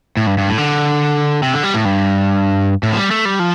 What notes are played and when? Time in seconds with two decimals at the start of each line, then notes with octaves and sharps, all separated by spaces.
0.17 A2
0.27 G2
0.38 G2
0.48 A2
0.58 D3
1.43 C3
1.54 D3
1.63 G3
1.74 A2
1.85 G2
2.83 A2
2.92 F3
2.97 G3
3.11 A3
3.25 G3
3.39 F3